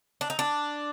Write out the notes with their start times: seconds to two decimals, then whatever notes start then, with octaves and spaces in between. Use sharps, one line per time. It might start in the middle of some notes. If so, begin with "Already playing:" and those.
0.21 D4
0.30 D#4
0.39 D4